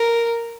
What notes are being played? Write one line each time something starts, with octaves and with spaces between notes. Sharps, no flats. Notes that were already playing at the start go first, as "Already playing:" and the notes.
Already playing: A#4